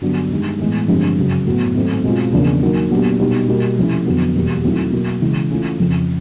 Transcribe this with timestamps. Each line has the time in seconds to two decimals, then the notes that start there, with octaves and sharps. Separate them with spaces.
0.01 G2 D3 F#3 B3 D4
0.31 G2 D#3 G#3
0.59 A2 E3 G#3 B3
0.88 G2 D3 F3 G#3 C4
1.18 F#2 C#3 F#3
1.46 A2 F#3 B3
1.74 G#2 D#3 F#3 A3 C4
2.04 B2 G#3 C4 F4
2.32 E2 C#3 F3 A#3 D4
2.62 D#3 F#3 A#3
2.90 A#2 F#3 B3 D4 G4
3.20 B2 G3 B3 D#4 F#4
3.49 B2 G3 A#3
3.77 C3 F3 A3 C#4 E4
4.06 F2 D3 F#3 B3
4.34 E2 B2 G3 A#3
4.64 D#3 F#3 A3 C4 E4
4.92 B2 F#3 A#3
5.21 C#3 E3 G#3
5.50 E3 A3 C#4 F4
5.79 F2 C#3 F3